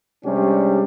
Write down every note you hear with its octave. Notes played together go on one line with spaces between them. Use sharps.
C3 G3 G#3 C#4 D4 G4